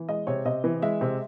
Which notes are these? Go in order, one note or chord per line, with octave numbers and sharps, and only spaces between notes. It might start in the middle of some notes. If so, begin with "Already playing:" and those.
Already playing: E3
G#3 D#5
C3 C#5
C3 D#5
E3
G#3 E5
C3